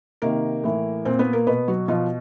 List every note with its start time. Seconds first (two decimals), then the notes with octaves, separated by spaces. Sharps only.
0.22 C3 D#3 A#3 A#4
0.64 A2 E3
1.05 A#2 C4 C5
1.19 B3 B4
1.33 A#3 A#4
1.47 B2 B3 B4
1.68 F#3 F#4
1.88 B2 F3 F4